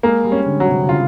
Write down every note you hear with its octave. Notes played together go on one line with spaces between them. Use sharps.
G#3 A#3
G3
C#4
D3
F#3
C3
D3
C#3 F4